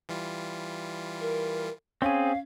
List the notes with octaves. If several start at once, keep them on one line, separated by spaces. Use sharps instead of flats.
E3 G3 F4
A#4
C4 C#4 G#4 F5